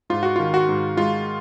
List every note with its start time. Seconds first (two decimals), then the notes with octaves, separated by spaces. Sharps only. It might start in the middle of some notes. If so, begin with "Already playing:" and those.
0.10 G#2 F4
0.23 F#4
0.36 D#3 F4
0.54 F#4
0.69 G#2
0.97 G#3 F4